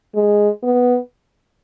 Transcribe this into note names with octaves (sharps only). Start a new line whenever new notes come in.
G#3
B3